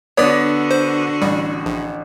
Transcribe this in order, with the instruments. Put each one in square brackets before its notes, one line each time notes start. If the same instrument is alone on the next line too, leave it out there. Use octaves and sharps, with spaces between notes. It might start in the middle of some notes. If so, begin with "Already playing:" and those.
[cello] D3 F#4 [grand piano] B3 D6 D#6 [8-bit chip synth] C#5 D5
[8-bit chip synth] C5
[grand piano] A1 [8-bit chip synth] G3
[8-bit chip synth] A#1